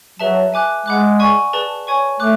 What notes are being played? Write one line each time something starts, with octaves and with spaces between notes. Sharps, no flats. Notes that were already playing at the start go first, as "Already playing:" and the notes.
F#3 G#4 B4 E5 A5
E5 G#5 D6 F#6
G#3 F#5 B5 D6 F#6
D5 G#5 C#6
G#4 B4 D5 A5
C#5 G#5 C#6
A3 D6 F#6